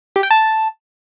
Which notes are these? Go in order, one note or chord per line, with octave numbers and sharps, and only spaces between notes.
G4
G5
A5